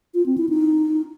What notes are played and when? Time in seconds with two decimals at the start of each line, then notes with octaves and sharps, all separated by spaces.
0.14 F4
0.26 C4
0.38 E4
0.49 D#4